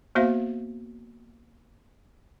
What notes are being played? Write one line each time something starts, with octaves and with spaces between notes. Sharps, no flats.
A#3 B3 F#4 C5 E5 F5